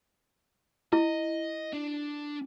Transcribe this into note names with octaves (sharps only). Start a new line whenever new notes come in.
E4 D#5
D4